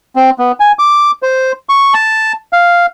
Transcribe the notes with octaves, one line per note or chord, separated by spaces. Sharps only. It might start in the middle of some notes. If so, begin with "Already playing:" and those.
C4
B3
G#5
D6
C5
C#6
A5
F5